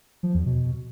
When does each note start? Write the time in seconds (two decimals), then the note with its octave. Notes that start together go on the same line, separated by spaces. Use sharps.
0.23 F3
0.34 E2
0.46 B2